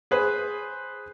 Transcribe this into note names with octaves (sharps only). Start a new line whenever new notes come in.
G#4 B4 C5